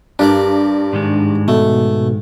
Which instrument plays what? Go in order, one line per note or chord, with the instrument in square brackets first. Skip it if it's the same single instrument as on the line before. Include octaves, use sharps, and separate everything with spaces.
[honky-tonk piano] G2 [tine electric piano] D4 [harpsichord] G4 A#4 D5
[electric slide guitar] G#2 D#3 G#3
[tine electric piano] B2 [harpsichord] A3